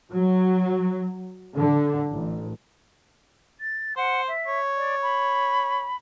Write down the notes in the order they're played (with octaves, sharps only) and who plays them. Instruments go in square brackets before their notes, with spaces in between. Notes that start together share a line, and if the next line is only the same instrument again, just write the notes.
[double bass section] F#3
D3
A1
[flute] A6
[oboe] C5 [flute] F#5
[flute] E5
[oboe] C#5
[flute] D5
B5